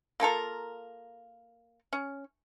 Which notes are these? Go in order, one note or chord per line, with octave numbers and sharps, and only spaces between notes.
A#3 F4 A4 A#4
C#4